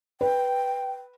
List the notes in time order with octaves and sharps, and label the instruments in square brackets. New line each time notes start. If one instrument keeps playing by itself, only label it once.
[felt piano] B4 [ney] G5